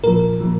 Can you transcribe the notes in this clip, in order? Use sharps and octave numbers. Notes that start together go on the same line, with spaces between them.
A#2 F3 A#4
A#2 F3